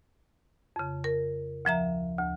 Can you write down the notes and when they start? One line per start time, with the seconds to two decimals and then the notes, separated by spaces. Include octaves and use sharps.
0.76 F2 C#3
1.04 A#4
1.65 D2 F3 E5 A#5
2.18 D2